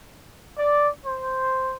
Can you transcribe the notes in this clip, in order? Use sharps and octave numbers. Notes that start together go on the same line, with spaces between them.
D5
C5